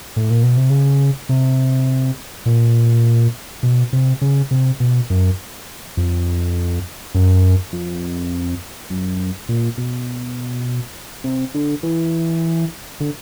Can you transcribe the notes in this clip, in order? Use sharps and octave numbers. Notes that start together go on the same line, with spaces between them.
A2
A#2
B2
C3
C#3
C3
A#2
B2
C3
C#3
C3
B2
F#2
F2
F#2
F2
F#2
A#2
B2
C3
D3
E3
D3